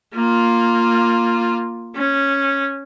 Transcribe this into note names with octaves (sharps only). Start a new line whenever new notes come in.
A#3 F4
C#4